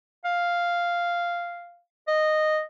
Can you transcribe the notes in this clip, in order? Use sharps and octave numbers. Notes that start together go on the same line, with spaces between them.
F5
D#5